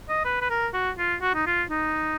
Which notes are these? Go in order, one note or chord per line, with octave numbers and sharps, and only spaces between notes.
D#5
B4
B4
A#4
F#4
F4
F#4
D#4
F4
D#4